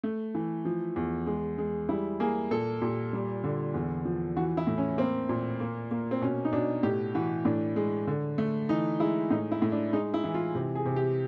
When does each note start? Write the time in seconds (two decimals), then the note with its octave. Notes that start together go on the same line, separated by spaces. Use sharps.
0.04 A3
0.35 E3
0.65 F3
0.96 E2
1.27 G#3
1.58 G#3
1.89 G3 E4
2.20 A#3 G#4
2.51 A#2 A4
2.82 A#2 G4
3.13 G3
3.44 D3
3.74 E2
4.05 F3
4.36 E3 F#4
4.57 E4
4.67 A2
4.78 C#4
4.98 A#3 C4
5.29 A#2
5.60 A#3
5.91 A#3
6.11 C4
6.21 B2 C#4
6.45 D#4
6.53 B2 D4
6.83 A2 G4
7.14 E3 F#4
7.45 A2 D4
7.76 G#3
8.07 D3
8.38 A3
8.69 E3 D#4
9.00 G#3 E4
9.30 A2 D#4
9.51 E4
9.62 A2
9.72 D4
9.93 G#3 D#4
10.14 E4
10.24 E3
10.34 F4
10.55 C3
10.75 G#4
10.85 C3
10.96 G4